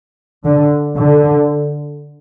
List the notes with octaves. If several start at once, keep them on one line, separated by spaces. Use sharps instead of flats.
D3
D3